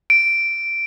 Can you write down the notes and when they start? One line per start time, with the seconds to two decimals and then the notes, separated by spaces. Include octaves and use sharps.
0.10 D7